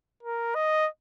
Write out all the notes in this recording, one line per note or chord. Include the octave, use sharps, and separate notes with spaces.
A#4
D#5